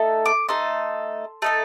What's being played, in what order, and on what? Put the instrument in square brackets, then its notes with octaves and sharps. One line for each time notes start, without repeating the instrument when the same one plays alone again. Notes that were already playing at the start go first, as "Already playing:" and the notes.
Already playing: [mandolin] A3 D#4 A4
D6
A3 D#4 A4 C6
A3 D#4 A4